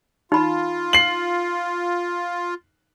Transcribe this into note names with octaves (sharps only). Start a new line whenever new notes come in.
D#4 F4 B5
C7 F#7